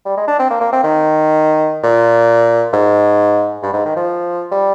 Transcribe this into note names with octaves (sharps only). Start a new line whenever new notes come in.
G3
G#3
D4
C4
A#3
A#3
C4
D#3
A#2
G#2
G2
G#2
D#3
F3
G3